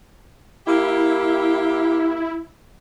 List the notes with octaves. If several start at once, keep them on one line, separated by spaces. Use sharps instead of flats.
A#3 E4 G4